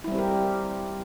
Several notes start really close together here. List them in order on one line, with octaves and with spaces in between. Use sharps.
E4 G3 C4 G4 A#4